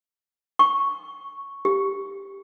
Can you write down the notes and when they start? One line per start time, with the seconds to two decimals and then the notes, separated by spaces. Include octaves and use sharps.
0.59 C#6
1.65 G4